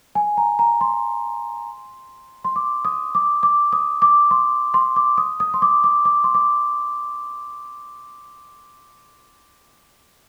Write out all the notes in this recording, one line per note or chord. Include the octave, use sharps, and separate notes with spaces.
G#5
A#5
A#5
C6
C6
D6
D#6
D6
D6
D#6
D6
C6
C6
D6
D#6
D#6
C6
D6
D6
D6
C6
D6